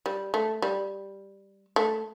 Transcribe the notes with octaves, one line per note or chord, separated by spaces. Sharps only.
G3
A3
G3
A3